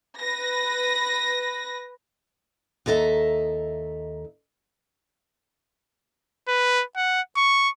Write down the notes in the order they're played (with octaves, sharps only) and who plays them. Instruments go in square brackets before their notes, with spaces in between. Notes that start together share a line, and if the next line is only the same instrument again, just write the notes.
[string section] B4 A#6
[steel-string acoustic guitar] D#2 D#4 A4 D#5 E5
[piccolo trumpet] B4
F#5
C#6